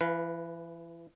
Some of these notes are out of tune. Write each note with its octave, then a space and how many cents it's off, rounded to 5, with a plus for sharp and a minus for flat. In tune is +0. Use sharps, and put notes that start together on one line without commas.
E3 +30 B4 +0 F5 +0